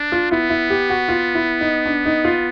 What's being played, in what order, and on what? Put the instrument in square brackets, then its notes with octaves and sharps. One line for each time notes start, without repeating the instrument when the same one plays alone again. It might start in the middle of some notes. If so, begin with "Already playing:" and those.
Already playing: [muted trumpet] D4
[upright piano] F4
[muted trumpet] B3 [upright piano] E4
[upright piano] E4
G4
F#4
F4
E4
D#4
D4
D#4
F4